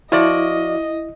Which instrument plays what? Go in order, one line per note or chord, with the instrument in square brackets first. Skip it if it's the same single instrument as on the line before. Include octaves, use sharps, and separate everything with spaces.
[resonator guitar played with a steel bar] F3 F#4 D5 [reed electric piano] E4 [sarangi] D#5